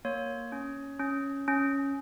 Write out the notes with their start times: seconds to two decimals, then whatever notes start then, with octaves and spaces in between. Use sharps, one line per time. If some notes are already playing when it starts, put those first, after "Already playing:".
0.05 A#3 C#5
0.52 C#4
1.00 C#4
1.48 C#4